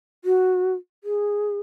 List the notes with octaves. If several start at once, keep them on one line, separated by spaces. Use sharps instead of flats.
F#4
G#4